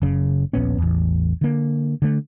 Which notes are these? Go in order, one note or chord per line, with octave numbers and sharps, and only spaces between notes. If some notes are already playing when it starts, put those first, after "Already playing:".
F#1 C#3
D#1 A#1 B3 C#4
A1 E2
D3 A#3
D3 A3